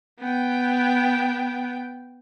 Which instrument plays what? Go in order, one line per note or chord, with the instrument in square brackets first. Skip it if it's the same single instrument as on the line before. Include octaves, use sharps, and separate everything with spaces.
[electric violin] B3 G5